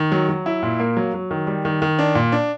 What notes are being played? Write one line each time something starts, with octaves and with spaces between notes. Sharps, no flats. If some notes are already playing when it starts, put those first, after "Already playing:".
Already playing: D#3
F#3
F#3
E4
A#2
A#3
F#3
F#3
D#3
G3
D#3
D#3
D4
A#2
D4